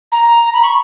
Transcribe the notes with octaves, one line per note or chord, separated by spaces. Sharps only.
A#5
B5
C#6